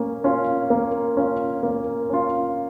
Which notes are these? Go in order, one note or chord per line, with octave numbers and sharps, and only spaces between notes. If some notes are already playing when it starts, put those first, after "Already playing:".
Already playing: A#3 C#4
C#4 F4
A#3
C#4 F4
A#3
C#4 F4